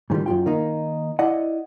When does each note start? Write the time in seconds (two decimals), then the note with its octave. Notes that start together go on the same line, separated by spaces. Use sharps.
0.10 G#2 D#3 F3 G3
0.26 F#2 F3 F4 G5
0.46 D#3 A#3 D#4
1.19 E4 D5 D#5 F#5